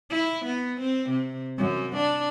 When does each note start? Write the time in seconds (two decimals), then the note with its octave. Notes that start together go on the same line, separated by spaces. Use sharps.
0.10 E4
0.45 B3
0.80 C4
1.10 C3
1.58 F#2
1.96 D4